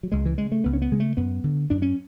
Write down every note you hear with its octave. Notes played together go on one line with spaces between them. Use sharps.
F#3
C#2 G#3
E3
C#3 G#3
A3
C#2 B3
C#4
B3
C#3 G#3
A3
F#2 B3
D3
F#2 D4
C#4